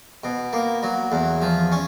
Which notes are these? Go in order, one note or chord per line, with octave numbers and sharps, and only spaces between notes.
B2
A#3
F#3
E2
F3
C#4